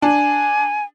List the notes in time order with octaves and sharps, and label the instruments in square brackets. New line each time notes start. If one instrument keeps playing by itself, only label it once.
[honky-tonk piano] D4 [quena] G#5